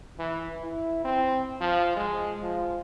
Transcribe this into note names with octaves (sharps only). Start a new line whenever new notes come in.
E3
E4
C4
F3
G#3
F3